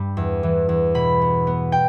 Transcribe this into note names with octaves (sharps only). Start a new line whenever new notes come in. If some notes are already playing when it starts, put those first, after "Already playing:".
Already playing: G2 G3 B5
E2
E3
E2
B2 B5
B3
B3
G5